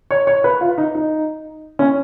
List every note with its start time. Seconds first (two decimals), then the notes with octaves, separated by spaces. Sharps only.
0.11 C#5
0.27 C#5
0.44 B4
0.61 F4
0.78 D#4
0.95 D#4
1.79 C#4